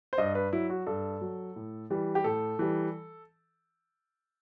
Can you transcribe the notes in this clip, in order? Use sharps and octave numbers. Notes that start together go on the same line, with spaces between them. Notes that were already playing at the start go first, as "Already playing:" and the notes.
C5
G2 D#5
B4
F#3 E4
F#4
G2 A4
F#3
A2
E3 G3
G4
A2 A4
E3 G3